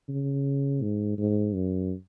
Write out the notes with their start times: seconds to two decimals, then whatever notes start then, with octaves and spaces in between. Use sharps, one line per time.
0.08 C#3
0.82 G#2
1.18 G#2
1.54 F#2